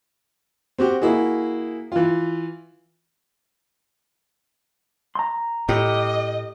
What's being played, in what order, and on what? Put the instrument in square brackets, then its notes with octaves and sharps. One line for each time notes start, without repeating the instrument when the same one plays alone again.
[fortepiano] C4 F#4 G4
A#3 E4 F#4 G#4
E3 F4
[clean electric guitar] A#5 C6
[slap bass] A2 [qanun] G4 [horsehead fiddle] D#5